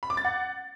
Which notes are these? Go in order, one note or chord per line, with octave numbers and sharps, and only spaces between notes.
B5
D6
A6
F#5